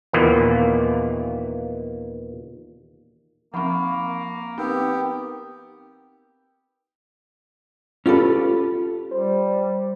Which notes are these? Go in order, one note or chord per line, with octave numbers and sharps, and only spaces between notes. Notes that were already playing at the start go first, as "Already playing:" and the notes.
D#2 A#2 D#3 E3 A#3 B3
F3 A#3 C4 F#5 B5 C#6
B3 C4 D#4 G4 A#4 E6
C#4 F4 G4 A4 B4
G3 C5